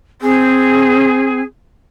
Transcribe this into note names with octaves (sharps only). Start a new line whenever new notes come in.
C4 G#4